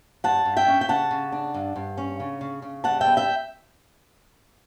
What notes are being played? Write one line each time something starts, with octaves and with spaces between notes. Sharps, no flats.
G2 F#5 A5
G2
E5 G5
C#4
G5
C#3 F#5 A5
C#3
D4
G2
G2
C#4
C#3
C#3
C#3
G3 F#5 A5
E5 G5
B3
E5 G5